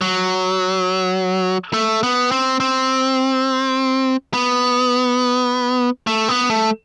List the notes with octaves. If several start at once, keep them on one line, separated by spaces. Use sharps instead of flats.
F#3
A3
B3
C4
C4
B3
A3
B3
A3